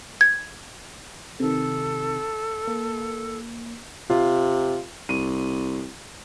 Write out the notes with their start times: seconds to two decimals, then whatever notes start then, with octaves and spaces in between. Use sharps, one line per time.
0.21 G#6
1.40 C3 D#3 A4
2.67 A#3
4.10 C3 F4
5.09 C2 D#7